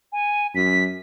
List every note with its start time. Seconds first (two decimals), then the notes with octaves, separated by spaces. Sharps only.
0.13 G#5
0.55 F#2 B6